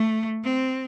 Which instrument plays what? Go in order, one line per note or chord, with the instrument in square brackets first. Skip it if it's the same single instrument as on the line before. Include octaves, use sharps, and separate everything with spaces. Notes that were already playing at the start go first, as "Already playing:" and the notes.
Already playing: [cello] A3
C4